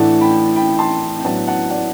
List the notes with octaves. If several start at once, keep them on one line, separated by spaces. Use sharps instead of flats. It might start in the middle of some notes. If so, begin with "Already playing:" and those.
Already playing: A2 E3 A3 D4 F#5 A5
G5 B5
G5 B5
A5 C6
G5
A2 F#3 B3 D4 F#5 A5
F#5 A5
D5 F#5